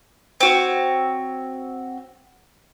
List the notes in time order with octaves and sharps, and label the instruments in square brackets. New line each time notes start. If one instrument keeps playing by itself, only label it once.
[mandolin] C4 F#4 C#5